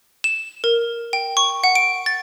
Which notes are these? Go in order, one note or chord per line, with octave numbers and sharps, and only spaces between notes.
E7
A#4
G5
C#6
F#5
D7
A6